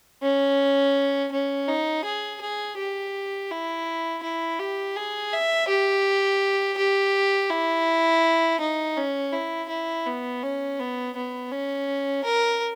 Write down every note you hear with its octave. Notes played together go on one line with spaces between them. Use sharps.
C#4
C#4
D#4
G#4
G#4
G4
E4
E4
G4
G#4
E5
G4
G4
E4
D#4
C#4
E4
E4
B3
C#4
B3
B3
C#4
A#4